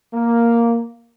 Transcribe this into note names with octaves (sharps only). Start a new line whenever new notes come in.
A#3